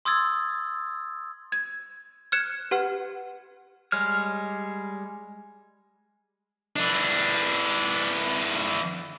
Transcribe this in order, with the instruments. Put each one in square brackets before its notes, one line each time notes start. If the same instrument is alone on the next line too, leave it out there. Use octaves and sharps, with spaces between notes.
[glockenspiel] C6 D#6 E6 G#6 A6
[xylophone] G#6
F6 F#6 G#6 C#7 E7
G4 B4 F#5 F6
[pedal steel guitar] G3 G#3 C#5 F6
[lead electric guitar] E3 D4